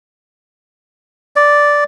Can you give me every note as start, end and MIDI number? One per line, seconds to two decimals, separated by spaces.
1.36 1.84 74